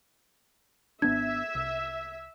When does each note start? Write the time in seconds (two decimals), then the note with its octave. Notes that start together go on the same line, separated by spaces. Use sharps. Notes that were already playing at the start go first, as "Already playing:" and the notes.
1.02 G#1 B3 D4 E5 G#6
1.55 C2